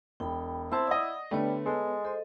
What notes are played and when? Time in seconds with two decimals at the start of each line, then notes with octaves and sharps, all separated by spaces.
0.20 E1 G5 B5
0.72 C4 E4 C5 A5 C6
0.87 D5 D#5 F#5 D#6
1.31 D3 G3 A3 B3 B4 C#5
1.66 G#3 A4
2.05 A4 C5 D#5